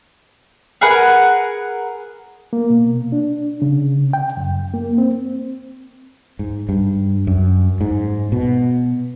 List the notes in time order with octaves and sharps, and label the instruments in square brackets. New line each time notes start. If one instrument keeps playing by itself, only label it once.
[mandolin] G#4 A#4 B4 F#5
[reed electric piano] A#3
B2
D4
C#3
G5
F#2
A#3
C4
[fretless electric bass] G#2
G2
F#2
G#2
B2